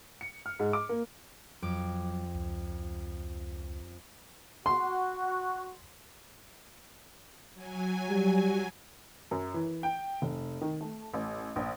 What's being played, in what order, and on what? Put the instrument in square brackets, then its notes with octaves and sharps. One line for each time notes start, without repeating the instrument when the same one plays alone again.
[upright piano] C#7
F6
G#2
D6
A#3
[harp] F2 D6 [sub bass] F#3
[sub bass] C#2
[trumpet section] F#4 [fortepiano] C6
[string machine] F#3 G#5
[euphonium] G3
[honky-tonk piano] F#2
E3
G5
F1
D#3
A3
A1
A#1